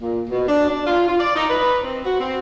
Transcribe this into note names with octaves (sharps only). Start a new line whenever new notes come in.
A#2
B2
D4
D4
F4
F4
D5
D#4
B4
C4
F#4
C4